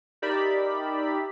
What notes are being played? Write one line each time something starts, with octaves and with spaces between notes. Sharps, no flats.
D#4 G4 A#4 D5 E5 B5